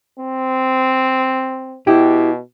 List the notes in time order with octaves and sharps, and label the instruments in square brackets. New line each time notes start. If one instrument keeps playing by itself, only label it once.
[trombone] C4
[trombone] B2 [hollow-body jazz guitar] E4 G4